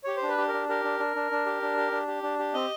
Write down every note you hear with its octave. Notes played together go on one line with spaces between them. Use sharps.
G4 C#5
C5
D4
B4
G4
A#4
D4
G4 A#4
D4
D4
D4
D4
G4
D4
G4
D4
G4
D4
G4
C4 D#5